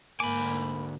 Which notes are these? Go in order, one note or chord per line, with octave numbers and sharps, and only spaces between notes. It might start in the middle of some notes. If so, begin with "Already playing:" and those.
D2 G#2 A#3 G#5 B5 D6